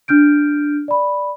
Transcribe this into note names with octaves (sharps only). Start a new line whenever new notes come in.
D4 F6 G6 D7
D5 B5